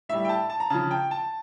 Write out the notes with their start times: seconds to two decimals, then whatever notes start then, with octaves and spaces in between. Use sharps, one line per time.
0.09 A2 G3 E5
0.25 G5
0.29 A5
0.50 A5
0.60 A#5
0.70 C#3 F3 A5
0.91 G5
1.11 A5